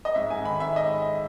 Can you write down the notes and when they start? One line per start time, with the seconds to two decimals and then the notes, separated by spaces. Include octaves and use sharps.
0.05 D#5
0.15 G#2 E5
0.30 G#2 G#5
0.45 D#3 B5
0.60 G#2 E5
0.76 D#5